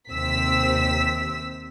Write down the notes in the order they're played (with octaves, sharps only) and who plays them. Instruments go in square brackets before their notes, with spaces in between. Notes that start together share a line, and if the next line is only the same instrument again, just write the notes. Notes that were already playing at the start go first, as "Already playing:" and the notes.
[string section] D#2 C3 C4 E6 B6